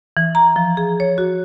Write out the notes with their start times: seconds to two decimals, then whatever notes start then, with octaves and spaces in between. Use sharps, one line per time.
0.17 E3
0.35 A#5
0.56 F3
0.77 G#4
1.00 C#5
1.18 F#4